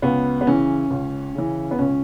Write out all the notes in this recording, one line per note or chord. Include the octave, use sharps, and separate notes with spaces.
C#2 B3
B3
C#3 E3 C#4
C#2
C#3 E3
B3
C#2 C#4